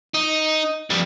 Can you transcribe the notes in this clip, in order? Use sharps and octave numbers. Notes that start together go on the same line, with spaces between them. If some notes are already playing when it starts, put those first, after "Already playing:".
D#4
F2 G3